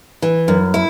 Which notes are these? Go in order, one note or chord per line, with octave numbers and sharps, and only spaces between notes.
E3
F#2
E4